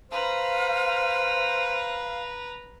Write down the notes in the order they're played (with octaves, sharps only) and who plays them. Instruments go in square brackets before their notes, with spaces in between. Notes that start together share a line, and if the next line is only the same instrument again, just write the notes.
[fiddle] B4 A#5 [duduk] C5 [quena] F5